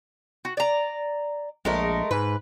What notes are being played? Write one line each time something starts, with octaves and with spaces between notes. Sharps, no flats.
F#4
D5 A#5
A#1 G#3 A3 A#4
G#2 B4